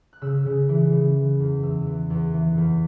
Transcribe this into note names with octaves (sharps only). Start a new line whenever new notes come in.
F#6
C#3 E6
C#3
E3
C#3
E3
E2
E2 E6
E3
E2
E3
E2